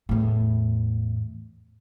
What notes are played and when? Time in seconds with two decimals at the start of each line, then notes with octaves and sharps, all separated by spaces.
0.09 E2 A2